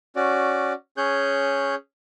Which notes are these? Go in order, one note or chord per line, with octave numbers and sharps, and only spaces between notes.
C#4 F#4 D5
C#4 G#4 C#5 F#6 G6